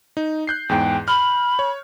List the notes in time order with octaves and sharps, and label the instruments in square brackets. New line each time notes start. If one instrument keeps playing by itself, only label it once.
[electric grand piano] D#4
F#6 G6 C7
[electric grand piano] E2 G#2 [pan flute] G5
[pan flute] B5 [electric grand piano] F6
[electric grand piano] C#5